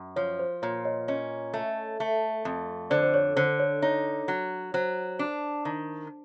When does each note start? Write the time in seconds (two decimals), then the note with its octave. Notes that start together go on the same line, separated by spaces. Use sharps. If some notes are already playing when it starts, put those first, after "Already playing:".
Already playing: F#2
0.16 F3 C#5
0.39 C5
0.62 A#2 C#5
0.85 C#5 D#5
1.08 C#4 C#5 D#5
1.54 A3
2.00 A3
2.45 F2
2.90 D3 C5 D5
3.03 C5
3.14 C#5
3.36 D3 C5
3.59 C#5
3.82 D#4 C#5
4.28 F#3
4.74 F#3 C5
5.19 D4
5.65 D#3